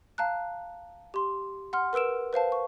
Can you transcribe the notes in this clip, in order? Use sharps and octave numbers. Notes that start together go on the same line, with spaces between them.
F5 A5 A#5 F#6
G4 C6
F#5 C6 F6
A#4 B4 E6 D7 E7
B4 C5 F5 A5
C#6